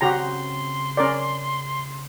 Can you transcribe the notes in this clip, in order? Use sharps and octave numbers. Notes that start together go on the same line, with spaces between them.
C#3 C4 F#4 G4 A#5 C6
C#4 A#4 D5